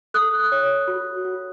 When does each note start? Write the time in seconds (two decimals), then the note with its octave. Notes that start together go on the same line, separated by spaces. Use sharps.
0.14 A4 D#6 F#6
0.52 C#5
0.88 F#4
1.25 F#4